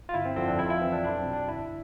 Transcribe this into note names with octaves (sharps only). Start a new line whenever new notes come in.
F4
G1 E4
C4
F2 D3 F3 C4
D4
F2 E4
F4
E4
E3 C4
D4
B1 D4
C4
B2
D4
G1 E4